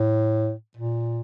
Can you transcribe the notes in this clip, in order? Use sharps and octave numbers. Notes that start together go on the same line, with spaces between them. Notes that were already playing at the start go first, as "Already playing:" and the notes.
Already playing: A2
A#2